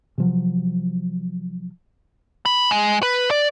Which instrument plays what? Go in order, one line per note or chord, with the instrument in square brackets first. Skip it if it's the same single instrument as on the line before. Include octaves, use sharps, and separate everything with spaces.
[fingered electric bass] C3 F3 F#3
[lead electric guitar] B5
G#3
B4
D5